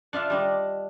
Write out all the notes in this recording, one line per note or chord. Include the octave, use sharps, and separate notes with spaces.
D4 F4 E5 F5
G3 D4 D#5